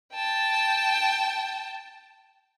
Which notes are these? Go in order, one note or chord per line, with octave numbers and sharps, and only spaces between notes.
G5 A5